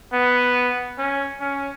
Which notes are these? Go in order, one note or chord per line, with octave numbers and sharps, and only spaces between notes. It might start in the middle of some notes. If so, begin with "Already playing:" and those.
B3
C#4
C#4